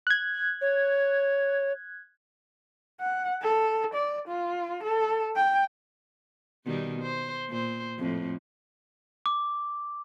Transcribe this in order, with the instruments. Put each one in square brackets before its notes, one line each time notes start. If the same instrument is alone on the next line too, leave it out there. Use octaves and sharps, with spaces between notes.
[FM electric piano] F#6 G#6
[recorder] C#5
[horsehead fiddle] F#5
A4
D5
F4
A4
G5
[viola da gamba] B2 D#3 G3
C5
A#2 C5
F2 A2
[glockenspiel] D6